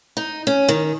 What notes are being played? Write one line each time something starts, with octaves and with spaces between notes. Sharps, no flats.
D#4
C#4
D#3